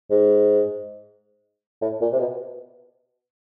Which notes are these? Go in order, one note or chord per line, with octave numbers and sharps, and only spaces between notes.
G#2
A2
A#2
C3
B2